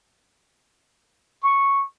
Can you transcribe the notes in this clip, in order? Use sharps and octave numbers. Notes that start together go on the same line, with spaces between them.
C#6